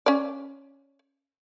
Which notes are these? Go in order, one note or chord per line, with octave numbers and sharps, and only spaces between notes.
C#4 D5